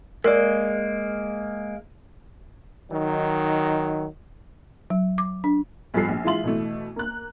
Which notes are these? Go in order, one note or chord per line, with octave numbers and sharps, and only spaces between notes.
G#3 A#3 A#4 D5
D#3 F#3 D#4
F#3
D6
D4
B1 G2 F3 A4 C7
A#1
E3 G#3 F4 E5 C6 F#7
B2 E3 A3
A#3 F#6